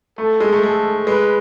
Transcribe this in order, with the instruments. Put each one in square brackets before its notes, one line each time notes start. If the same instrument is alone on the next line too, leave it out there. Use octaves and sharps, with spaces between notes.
[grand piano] A3 [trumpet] A4
[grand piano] G#3
A3
[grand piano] G#3 [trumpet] A4
[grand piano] G#3 [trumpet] B4